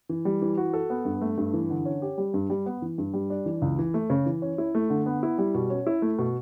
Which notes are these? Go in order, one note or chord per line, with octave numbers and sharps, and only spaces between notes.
E3
G3
E3
F#4
A4
B3
G2
A3
G2
E3
D3
C#4
G4
G3
G2
G3
B3
E3
G2
G3
D4
E3
C#2
E3
A3
C#3
E3
C#4
E4
A3
D3
B3
E4
G3
B2
C#4
E4
A3
B2